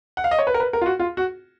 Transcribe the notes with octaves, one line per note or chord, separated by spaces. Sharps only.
F#5
F5
D#5
C#5
B4
A#4
B4
A#4
F4
F#4
F4
F#4